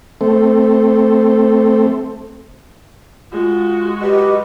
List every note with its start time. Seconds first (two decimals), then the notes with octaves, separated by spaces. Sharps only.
0.21 A3 C4
3.32 G#3 F4 F#4
4.01 F#3 G4 B4 D#5